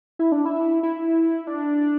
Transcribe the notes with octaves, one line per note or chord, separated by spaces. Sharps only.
E4
D4
E4
E4
D4